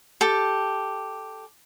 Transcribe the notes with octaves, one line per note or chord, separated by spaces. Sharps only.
G4 A4